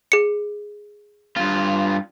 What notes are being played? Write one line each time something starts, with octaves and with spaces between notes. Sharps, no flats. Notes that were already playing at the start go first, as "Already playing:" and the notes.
G#4 C#7
G2 F4